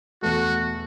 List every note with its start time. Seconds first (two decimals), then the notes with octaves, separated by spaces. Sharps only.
0.22 E2 B2 A3 F#4